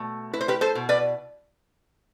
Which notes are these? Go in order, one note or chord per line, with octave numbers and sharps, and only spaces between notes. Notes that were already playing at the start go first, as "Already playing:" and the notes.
Already playing: B2 A3
E4 B4
C5
G4 B4
A4 C5
B2
B4 D5